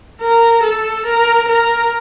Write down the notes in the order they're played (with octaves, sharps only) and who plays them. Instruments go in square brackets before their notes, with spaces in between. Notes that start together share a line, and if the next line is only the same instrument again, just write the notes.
[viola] A#4
A4
A#4
A#4